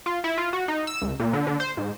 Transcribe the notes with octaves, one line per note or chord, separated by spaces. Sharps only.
F4
E4
F4
F#4
D#4
E6
C#2
A#2
D3
D3
C5
G#2